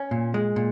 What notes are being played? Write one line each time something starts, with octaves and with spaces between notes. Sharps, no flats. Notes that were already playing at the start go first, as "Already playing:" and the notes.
Already playing: C#4
A#2
G#3
A#2